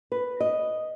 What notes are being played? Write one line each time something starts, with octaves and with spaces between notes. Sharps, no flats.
B4
D#5